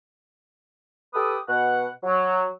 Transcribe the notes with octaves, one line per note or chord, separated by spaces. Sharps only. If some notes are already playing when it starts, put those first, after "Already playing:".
G4 A4 B4 D#6
B2 F#5
F#3